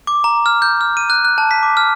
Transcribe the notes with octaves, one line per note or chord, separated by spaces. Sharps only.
D6
A#5
F6
G6
F6
D#7
F#6
F#6
A5
B6
D6
F6